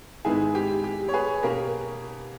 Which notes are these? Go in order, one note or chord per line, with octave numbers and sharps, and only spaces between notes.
G#2 D#3 G#3 B3 E4 G#4
G4
G4
C#5
G#4 B4
B2 A#3 C#4 G4 A#4